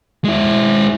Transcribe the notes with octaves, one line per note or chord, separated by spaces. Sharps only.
G#3 E4